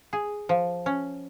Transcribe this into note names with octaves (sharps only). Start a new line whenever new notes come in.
G#4
F3
C#4